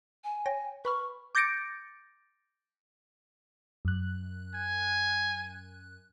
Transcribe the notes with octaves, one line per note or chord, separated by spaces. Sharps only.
G#5
C#5 G5 A#6
B4 B5 C#6 F6
D6 G6 A6 A#6 C#7 D7
F#2 F#6
G#5